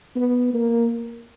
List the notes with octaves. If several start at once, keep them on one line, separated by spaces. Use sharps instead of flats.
B3
A#3